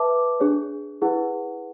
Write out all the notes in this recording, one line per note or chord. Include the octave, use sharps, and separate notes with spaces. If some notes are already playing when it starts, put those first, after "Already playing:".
Already playing: B4 E5 A5 D6
D4 G#4 C#5
E4 G#4 B4 F#5